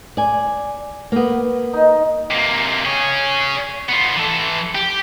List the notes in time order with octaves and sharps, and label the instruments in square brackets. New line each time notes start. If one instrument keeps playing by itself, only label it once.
[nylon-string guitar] D5 G#5
A#3 B3
[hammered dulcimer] D#4
[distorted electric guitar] C3 A#3
G#4 C#5
B3 F4
E3 A4
G4